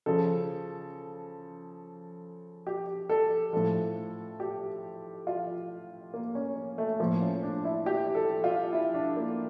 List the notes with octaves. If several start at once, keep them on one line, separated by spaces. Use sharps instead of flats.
C#3 F3 A4
G4
A4
A2 F3 A4
G4
F4
A#3
C#4
A3
A2 F3 A#3
C#4
D4
E4
G4
A4
F4
E4
D4
A#3